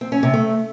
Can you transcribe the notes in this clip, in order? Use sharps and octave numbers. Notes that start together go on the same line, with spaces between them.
C4
C#4
C3
A3